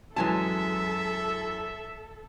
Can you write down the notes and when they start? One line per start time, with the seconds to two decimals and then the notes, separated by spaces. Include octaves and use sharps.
0.16 F#2 E3 F#3 G#3 A4 E5 G#5 A5